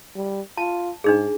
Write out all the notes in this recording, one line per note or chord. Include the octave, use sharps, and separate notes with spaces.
G3
F4 A5
G#2 D4 D#4 G#4